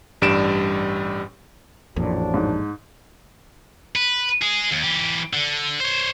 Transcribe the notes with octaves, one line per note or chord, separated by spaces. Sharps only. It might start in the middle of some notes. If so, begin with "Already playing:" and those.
A1 G2 G3 D7 E7
A1 F2 A#2 F3 F#3 D4
G#2
B4
G#3 G#4
D#2
E3 G4
D3
C5 C#5